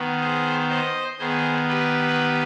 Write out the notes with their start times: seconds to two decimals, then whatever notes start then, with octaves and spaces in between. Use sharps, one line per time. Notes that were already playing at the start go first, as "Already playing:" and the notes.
Already playing: D#3 B3
0.21 G#4 C5
0.70 C5 D#5
1.19 D#3 B3 G#4 C5
1.68 G4 B4